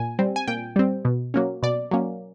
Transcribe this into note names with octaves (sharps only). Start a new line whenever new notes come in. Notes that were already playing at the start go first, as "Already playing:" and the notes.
Already playing: A#2 G#5
G3 C4
G#5
A#2 G5
G3 C4
B2
F#3 A#3 C#4
B2 D5
F#3 A#3 C#4